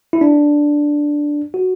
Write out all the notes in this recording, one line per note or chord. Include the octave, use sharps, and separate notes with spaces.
E4
D4
F#4